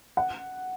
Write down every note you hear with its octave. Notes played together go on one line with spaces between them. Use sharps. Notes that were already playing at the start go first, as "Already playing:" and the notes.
F#5